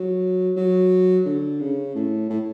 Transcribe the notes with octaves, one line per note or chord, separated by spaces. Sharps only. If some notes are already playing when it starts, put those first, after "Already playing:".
Already playing: F#3
F#3
D3
C#3
A2
A2